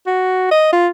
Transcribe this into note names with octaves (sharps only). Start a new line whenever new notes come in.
F#4
D#5
F4